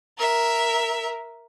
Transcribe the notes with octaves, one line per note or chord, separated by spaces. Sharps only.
A#4 E5